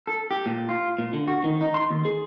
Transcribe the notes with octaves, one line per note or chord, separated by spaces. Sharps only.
A4
G4
A#2
F4
A#2
D3
F#4
D#3
D#4
C6
D#2
G#4